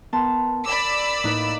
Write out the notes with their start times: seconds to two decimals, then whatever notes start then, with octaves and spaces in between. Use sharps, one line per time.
0.13 B3 A#4 A5 C6
0.66 D5 B5 D6 E6
1.24 A2 A#3 D#4 B4